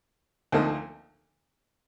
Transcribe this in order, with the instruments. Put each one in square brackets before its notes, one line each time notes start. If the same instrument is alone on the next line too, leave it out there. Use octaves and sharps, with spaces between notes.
[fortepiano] D2 D3 F3 A#3 D#4